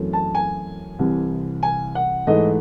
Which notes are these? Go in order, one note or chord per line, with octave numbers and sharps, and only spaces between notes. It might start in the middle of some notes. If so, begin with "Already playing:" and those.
Already playing: F#2 E3 A3 C4
A5
G#5
C2 C3 E3 C4
G#5
F#5
G#2 E3 A3 D#5